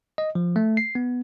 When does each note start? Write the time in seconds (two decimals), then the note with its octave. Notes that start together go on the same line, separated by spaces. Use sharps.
0.18 D#5
0.35 F3
0.56 A3
0.77 C7
0.95 B3